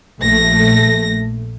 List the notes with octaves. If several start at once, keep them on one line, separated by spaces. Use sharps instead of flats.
A#1 A3 A#6